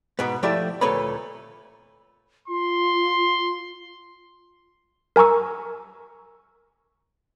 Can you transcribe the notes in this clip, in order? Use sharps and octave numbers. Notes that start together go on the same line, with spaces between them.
G#2 B2 B3
F3 A3 E4 G4 D5 E5
D2 A#2 A3 B4 C#5 B5
F4 C6
A#4 G#5 A#5 C#6 E6